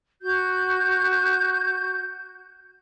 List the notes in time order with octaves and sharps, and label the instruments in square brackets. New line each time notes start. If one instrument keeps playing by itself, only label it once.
[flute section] F#4 G6